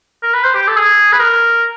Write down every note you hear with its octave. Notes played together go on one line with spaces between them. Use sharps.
A#4
B4
C5
G4
A4
G#4
B4
A#4